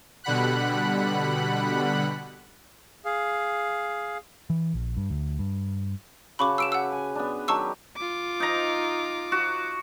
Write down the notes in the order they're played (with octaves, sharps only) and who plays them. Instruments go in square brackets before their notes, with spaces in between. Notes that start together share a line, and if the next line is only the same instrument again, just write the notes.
[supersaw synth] B2 D3 G3 F#5 B5 F#6
[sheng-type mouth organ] G#4 F5
[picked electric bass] E3
A#1
G2
D2
G2
[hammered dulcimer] C#3 F#4 A5 [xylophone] B5 C#6 D6
[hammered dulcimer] G4 B4 [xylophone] E6 D7 E7
[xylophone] F#5 E6
[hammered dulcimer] G#5
B3 D4
[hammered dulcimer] D#3 F#3 G4 [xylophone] A5 C#6 E6
[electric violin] F4 D6
[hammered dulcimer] D#4 A#5
F#4